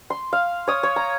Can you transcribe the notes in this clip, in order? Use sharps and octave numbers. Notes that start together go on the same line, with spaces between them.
C6
F5
C#5 D#6
C#5
A#5